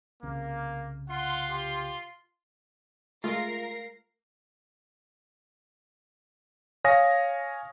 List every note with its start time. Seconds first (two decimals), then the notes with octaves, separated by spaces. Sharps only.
0.23 C2 C#3 A#3
1.10 F4 F#5 C6
1.50 G4
3.24 G#3 A3 F4 A#4 A#6 C7
6.84 C#5 F5 G#5 D#6 A#6